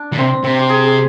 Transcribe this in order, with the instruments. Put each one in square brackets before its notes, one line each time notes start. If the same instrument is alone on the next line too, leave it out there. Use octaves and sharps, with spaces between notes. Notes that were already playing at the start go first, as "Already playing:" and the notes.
Already playing: [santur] D4
[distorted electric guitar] A#2
[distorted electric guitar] C3 [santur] C4
[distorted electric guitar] C3 [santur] C4
[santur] G4
G#4
G#4